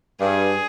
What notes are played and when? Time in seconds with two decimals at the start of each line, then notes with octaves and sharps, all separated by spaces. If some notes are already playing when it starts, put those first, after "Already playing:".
0.21 G2 G#4